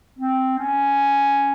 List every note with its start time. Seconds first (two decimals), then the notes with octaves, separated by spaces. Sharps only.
0.19 C4
0.58 C#4